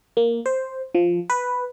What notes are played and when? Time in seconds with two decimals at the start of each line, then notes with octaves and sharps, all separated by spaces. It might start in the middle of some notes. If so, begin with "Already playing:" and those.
0.17 A#3
0.46 C5
0.95 F3
1.30 B4